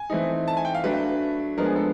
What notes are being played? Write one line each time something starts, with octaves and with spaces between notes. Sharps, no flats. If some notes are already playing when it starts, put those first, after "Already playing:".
Already playing: G#5
E3 A3 C4 D#4
A5
G#5
G5
F5
F#3 A3 D4 B4
F3 G#3 B3 D4 A#4
G#4
A4